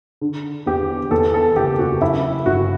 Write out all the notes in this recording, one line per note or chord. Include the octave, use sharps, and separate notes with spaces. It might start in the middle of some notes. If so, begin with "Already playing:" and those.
D3
E2 G4
E2 A4
A4
F#1 G4
F#4
F#2 E4
G1 F#4